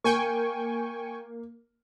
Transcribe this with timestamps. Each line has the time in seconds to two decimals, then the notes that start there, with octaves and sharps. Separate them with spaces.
0.04 A#3 G5 G#5 C#6